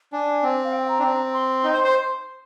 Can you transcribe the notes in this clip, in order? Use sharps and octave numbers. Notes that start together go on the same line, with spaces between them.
D4 G#5
C4
F5
G5
A#5
D4
C4
C6
D#4
C5
C5